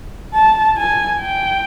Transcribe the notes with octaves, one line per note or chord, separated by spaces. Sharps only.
A5
G#5
G5